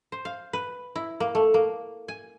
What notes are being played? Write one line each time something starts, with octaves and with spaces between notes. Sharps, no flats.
C5
F5
B4
E4
A#3
A3
A#3
G#5